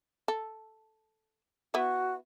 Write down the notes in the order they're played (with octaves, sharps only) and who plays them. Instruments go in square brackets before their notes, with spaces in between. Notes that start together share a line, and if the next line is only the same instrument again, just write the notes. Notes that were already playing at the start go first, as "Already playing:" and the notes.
[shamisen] A4
[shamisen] B3 E4 [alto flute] F#4